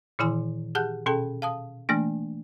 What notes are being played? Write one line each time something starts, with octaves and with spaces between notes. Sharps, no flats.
A#2 D#3 E3 E4 G#5 C6
G4 G#4 F#5 A5 F#6 G6
B2 C#4 G#4 A4 G5 A5
F5 A5 D#6
E3 A3 A#3 D4